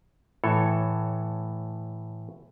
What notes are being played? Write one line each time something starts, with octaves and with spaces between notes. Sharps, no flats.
A2 E3 A4 C#5